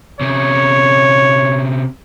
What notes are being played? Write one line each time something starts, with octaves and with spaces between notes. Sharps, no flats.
C3 C#4 C#5